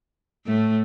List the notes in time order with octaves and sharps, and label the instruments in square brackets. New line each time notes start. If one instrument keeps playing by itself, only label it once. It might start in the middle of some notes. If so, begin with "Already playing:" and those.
[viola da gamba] A2 A3